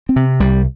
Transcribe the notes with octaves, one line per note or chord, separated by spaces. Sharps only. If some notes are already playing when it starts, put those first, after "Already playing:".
C4
C3
C2 G3